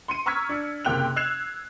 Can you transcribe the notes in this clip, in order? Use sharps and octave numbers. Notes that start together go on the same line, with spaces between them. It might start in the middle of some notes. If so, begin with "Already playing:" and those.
C6 C#7 D#7
A#5 C#6 E6 F6 G#6 B6
D4 C#7
F#1 C3 A#3 G5 F#6 F7
E6 F#6 G#6 C7 E7 F7